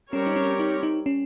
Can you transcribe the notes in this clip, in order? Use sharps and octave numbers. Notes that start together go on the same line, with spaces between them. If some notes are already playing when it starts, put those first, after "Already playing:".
G3 C4 C#4 G4 A#4 C#5
D#4
C#4
D#4
D#4
C#4